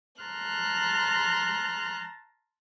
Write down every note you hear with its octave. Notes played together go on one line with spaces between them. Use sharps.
A5 A#5 C6 F6 F#6